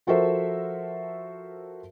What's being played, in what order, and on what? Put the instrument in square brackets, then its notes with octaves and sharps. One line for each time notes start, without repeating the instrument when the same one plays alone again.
[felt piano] F3 F#4 A4 A#4 C5 E5